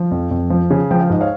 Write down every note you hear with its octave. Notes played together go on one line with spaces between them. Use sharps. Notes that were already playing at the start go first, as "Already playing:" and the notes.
Already playing: F3
F2
F2
F3
C#3
F3 G5
F5
G#2 D#5
C#5 F5